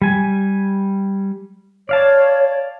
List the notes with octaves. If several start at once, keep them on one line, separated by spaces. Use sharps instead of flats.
G3 G#5
C#5 D5 F5 A5